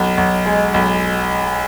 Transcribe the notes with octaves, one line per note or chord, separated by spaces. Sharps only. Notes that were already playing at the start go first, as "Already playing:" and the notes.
Already playing: B1
B1
G#3
B1